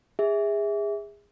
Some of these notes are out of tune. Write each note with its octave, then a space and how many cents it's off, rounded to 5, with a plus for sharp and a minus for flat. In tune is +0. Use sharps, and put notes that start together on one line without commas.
G#4 -25 E5 -15